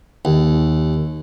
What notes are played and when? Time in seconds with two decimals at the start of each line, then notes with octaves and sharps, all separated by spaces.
0.25 D#2